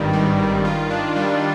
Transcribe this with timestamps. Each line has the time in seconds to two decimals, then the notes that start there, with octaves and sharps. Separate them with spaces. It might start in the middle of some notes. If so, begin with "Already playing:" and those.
Already playing: G#1 G2 D#3 G3
0.13 G3
0.39 D#3
0.65 F4
0.90 D4
1.16 G3